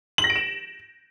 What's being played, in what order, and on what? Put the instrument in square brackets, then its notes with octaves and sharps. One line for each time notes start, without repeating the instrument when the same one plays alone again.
[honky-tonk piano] F#7
A#6
D7
E7